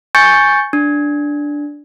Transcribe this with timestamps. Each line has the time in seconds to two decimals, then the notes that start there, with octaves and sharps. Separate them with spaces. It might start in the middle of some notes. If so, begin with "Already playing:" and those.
0.15 G#5 C#6 G6 A6 C#7
0.73 D4